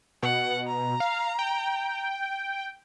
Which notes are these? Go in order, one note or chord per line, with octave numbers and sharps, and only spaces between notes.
B2 F#5
A#5
F5
G5